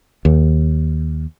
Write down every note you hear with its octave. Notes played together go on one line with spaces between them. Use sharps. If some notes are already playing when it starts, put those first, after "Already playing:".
D#2